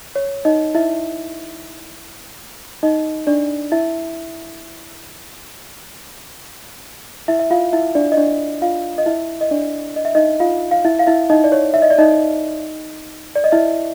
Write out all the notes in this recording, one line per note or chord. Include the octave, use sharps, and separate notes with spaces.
C#5
D#4 D#5
E4 E5
D#4 D#5
D4 D5
E4 E5
E4 E5
E5
F4 F5
E4 E5
D4 D5
D#5
D4 D5
F4 F5
D#5
E4 E5
D#5
D4 D5
D#5
E5
D#4 D#5
F4 F5
F5
E4 E5
F5
E4 E5
D#4 D#5
D5
C#5
E5
D#5
D5
D#4 D#5
D5
D#5
E4 E5